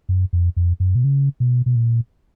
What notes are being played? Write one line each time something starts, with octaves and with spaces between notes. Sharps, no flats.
F#2
F2
F2
F#2
B2
C#3
B2
B2
A#2